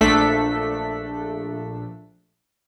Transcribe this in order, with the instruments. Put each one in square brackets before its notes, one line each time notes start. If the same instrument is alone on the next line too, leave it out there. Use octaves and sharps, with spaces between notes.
[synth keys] A#1 A3 D4 A4 B6